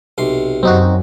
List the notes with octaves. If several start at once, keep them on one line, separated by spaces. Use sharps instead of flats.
B1 C3 C6
F#2 F#3 C4 D#4 F#4